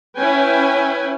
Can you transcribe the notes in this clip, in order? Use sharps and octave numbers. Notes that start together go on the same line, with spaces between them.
C#4 E4 B4 G5 G#5